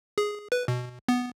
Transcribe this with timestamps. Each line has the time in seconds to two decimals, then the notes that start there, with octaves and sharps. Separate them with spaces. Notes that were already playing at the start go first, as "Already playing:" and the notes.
0.18 G#4
0.52 B4
0.68 B2
1.08 B3